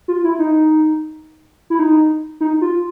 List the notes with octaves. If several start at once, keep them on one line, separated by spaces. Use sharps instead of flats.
F4
E4
D#4
E4
D#4
D#4
F4